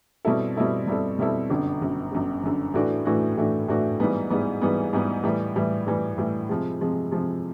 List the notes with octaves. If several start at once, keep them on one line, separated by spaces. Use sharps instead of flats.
B2 G3 C4 E4 A4
B2 G3 C4 E4 A4
B2 G3 C4 E4 A4
B2 G3 C4 E4 A4
G1 F#2 D3
G1 F#2 D3
G1 F#2 D3
G1 F#2 D3
A2 E3 A3 D4 F#4
A2 E3 A3 D4 F#4
A2 E3 A3 D4 F#4
A2 E3 A3 D4 F#4
G#2 E3 G3 B3
G#2 E3 G3 B3
G#2 E3 G3 B3
G#2 E3 G3 B3
A2 E3 G3
A2 E3 G3
A2 E3 G3
A2 E3 G3
C3 F3 G#3
C3 F3 G#3
C3 F3 G#3